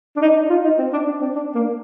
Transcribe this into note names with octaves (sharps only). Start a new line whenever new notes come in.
D4
D#4
D#4
F4
D#4
C4
D4
D4
C4
D4
A#3